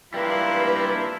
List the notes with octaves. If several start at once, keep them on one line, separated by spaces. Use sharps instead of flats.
G3 A#3 D4 E4 F4 B4